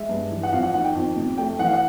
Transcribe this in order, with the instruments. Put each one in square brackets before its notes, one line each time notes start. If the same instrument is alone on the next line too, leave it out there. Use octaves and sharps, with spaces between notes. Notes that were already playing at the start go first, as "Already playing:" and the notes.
Already playing: [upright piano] G#3 E5
G2
E3
F#5
F2 F5
F#5
D#3 F#5
G5
F2
C3
A3 G5
E3 F#5
F5
F#5